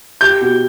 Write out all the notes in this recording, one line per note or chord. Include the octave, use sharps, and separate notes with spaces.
G4 G6
B2